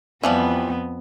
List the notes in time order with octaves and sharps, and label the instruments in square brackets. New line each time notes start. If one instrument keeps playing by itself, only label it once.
[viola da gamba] F2 B3 [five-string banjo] E3 F3 G3